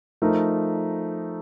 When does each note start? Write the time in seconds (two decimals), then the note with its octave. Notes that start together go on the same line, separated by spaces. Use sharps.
0.22 F3 A3 D#4 A#4